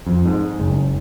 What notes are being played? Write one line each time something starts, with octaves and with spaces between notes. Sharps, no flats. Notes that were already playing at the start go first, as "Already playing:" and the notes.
F2
G#2
F#1